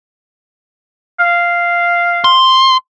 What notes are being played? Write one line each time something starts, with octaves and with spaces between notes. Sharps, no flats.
F5
C6